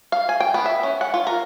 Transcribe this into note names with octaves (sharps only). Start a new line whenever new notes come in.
F5
G#5
G5
B3
E5
C#4
F#5
F4
A#4